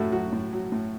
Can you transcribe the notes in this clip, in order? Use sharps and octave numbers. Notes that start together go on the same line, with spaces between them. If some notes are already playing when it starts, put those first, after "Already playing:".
Already playing: A2 F#3 E4 F#4 A4
F#3 F#4
A2
F#3
A2